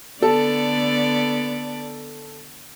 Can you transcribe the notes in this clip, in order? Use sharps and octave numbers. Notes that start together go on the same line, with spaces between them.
D3 B3 A4 D5